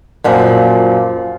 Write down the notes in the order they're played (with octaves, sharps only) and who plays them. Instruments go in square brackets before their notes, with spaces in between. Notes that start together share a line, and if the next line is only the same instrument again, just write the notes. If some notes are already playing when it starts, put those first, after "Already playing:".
[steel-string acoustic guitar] F#2 A#2 F3